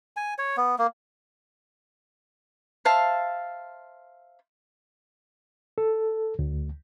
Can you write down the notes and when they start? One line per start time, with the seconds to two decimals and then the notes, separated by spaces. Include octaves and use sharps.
0.17 G#5
0.38 C#5
0.57 B3
0.79 A#3
2.85 C5 E5 F5 A5
5.78 A4
6.39 D2